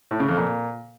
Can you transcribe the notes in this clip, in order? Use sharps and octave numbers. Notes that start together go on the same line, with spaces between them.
A2
C#3
F2
A#2